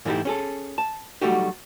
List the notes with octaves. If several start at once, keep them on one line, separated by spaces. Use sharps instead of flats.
G#2 E3 A3 D#4 E4 G4
C#4 G#4 A4
A5
F#3 G3 A3 D#4 F#4 G4